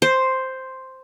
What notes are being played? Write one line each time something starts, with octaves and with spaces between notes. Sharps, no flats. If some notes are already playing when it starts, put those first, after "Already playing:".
C5